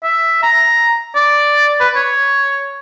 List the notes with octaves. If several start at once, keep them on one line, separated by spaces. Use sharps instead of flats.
E5
A#5
D5
B4
C#5